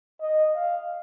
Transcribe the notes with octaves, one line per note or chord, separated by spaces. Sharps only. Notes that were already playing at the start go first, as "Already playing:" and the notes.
D#5
F5